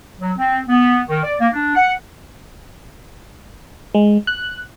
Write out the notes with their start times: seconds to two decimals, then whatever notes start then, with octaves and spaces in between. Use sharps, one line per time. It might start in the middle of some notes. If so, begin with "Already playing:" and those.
0.21 F#3
0.38 C4
0.69 B3
1.09 D#3
1.23 D5
1.40 A#3
1.53 D4
1.75 F#5
3.94 G#3
4.27 F#6